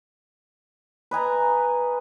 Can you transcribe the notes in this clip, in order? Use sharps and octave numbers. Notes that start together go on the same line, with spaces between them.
B4 D#5 G#5 A#5